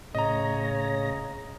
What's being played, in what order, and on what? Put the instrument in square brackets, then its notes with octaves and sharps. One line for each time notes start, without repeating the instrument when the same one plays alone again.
[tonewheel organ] A2 A#6 [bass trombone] C#3 [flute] C#5 [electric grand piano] D#5 A#5